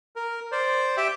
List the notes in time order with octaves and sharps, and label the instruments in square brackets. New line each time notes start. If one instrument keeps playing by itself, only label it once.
[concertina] A#4
C5 D5
G4 E5 G5